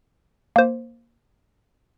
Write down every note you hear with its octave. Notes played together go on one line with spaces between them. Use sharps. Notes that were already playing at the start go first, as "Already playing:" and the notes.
A#3 C5